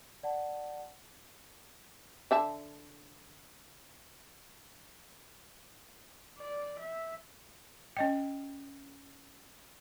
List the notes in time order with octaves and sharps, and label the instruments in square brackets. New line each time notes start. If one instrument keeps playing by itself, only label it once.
[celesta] D5 F#5 A5
[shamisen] D3 E5 A5
[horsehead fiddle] D5
E5
[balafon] C#4 D#5 G5